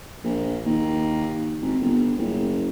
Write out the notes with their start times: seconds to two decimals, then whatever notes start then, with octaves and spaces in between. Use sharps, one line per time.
0.24 A#1
0.65 D#2
1.62 G#1
1.81 G1
2.18 F#1